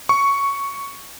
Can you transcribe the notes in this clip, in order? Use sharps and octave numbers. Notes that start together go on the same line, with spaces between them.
C#6